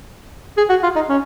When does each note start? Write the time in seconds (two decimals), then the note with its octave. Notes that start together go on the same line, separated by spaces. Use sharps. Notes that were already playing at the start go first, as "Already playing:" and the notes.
0.57 G#4
0.69 F#4
0.83 F4
0.96 D#4
1.09 C#4